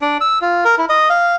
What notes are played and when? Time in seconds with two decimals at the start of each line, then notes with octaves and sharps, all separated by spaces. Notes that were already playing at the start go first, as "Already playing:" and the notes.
0.02 D4
0.21 E6
0.42 F4
0.65 A#4
0.78 E4
0.89 D#5
1.10 F5